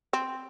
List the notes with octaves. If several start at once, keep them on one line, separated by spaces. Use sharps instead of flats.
C4